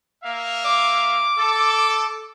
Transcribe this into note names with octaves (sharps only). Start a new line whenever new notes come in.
A#3 E5 F5
D6
A4